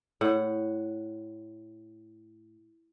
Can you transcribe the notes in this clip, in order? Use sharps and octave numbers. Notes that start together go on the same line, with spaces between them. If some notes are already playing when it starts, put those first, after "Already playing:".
A2 F#5